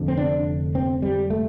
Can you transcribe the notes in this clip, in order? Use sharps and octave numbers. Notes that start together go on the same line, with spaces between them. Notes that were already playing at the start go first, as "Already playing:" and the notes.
Already playing: F1 F2 D3
C4
D4
C4
G3
A3